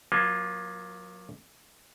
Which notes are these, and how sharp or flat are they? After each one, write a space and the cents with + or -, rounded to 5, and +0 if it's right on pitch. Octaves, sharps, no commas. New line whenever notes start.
F#3 -25 A#3 +25 F4 +0